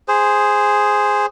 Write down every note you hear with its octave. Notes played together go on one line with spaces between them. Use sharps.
G#4 C5